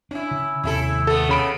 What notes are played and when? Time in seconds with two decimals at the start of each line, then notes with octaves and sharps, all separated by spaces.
0.11 C#4 D4 E4
0.31 C#3
0.64 D#2 C3 D#3 C#4 E4 A4
1.07 A3 B3 A4
1.29 C#3 B5 D7